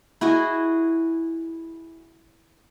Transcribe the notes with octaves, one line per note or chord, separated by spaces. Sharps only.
E4 F#4 G#4 D#5